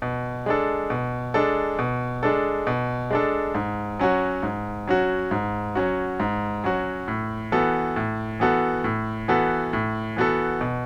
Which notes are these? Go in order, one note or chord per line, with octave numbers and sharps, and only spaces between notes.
B2
G#3 D4 A4
B2
G#3 D4 A4
B2
G#3 D4 A4
B2
G#3 D4 A4
G#2
F#3 C#4 F#4
G#2
F#3 C#4 F#4
G#2
F#3 C#4 F#4
G#2
F#3 C#4 F#4
A2
E3 B3 F#4 A4
A2
E3 B3 F#4 A4
A2
E3 B3 F#4 A4
A2
E3 B3 F#4 A4
B2